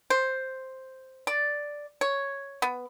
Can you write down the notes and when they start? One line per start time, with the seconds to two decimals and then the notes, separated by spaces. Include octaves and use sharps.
0.10 C5
1.27 D5
2.01 C#5
2.62 B3